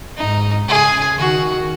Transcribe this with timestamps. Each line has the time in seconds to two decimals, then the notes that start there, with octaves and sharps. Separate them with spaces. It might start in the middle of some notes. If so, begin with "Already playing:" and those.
0.17 G#2 D#4
0.68 C#3 G#4
1.18 D#3 F#4